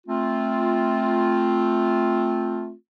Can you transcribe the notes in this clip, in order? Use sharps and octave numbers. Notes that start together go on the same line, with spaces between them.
A3 C4 F4